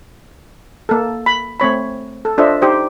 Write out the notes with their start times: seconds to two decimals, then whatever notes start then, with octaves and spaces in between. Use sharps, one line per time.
0.89 A#3 A4
1.26 B5
1.60 A3 C4 C#5 B5
2.25 A4
2.38 D4 F4 A4 C5 D#5 E5
2.62 D#4 G4 C5